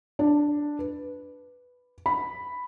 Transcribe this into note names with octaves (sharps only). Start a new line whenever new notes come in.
D4
B4
B5